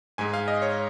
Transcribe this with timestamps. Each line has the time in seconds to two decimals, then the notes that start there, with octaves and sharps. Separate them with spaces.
0.18 G#2 G#3 G#5
0.33 F5
0.48 D#5
0.62 C#5